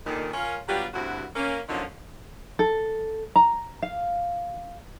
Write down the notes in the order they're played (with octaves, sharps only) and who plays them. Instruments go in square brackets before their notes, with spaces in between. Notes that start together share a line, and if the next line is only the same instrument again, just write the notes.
[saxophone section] D#2 A#2 D3 D#3
C#4 F4 A#4
F#3 G3 B3 D4 F4 G4
D2 G2 C4 E4 F#4
A#3 C#4
A#2 D3 F3 F#3 C#4 D#4
[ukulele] A4
A#5
F5